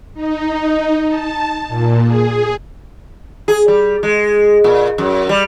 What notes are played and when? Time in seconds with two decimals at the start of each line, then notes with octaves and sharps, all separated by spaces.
0.14 D#4
1.07 A5
1.68 A#2
2.03 G#4
3.48 G#4
3.68 G3
4.03 G#3
4.64 A#2
4.98 F#2
5.29 G3